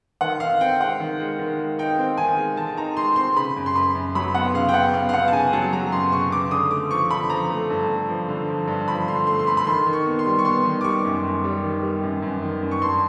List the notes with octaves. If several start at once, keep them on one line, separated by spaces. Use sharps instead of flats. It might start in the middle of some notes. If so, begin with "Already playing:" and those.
D#3 F#5
D#3 F5
C4 G5
G#3 F#5
D#3
G#3
D#3
G#3
D#4 G5
C4
D#3 G#5
G#3
D#3 A5
D#4 A#5
G#3 C6
C4 C6
C#3 B5
F#2
C6
F#2 B5
F#2
F#3 B5
B3 F#5
C#3 F5
G5
B3 F#5
B3 F5
F5
B3 F#5
A5
C#3 G#5
F#3 A5
F#3 A#5
F#2 C6
C#3 C#6
C#3 D6
D3 D#6
A3 D6
F3 C#6
D3 B5
F3 A#5
A3
G2
A3
F3
D3
F3
G2
F3 B5
D3 C6
A3 C6
C6
A3 B5
B5
D#3 C6
D#3
C#6
B3
C6
G3
C#6
B3 C6
D#3
D6
G3 C#6
F#2
F#2
G3
D#3
G3
F#2
F#2
D#3
F#2
C#6
G2 C6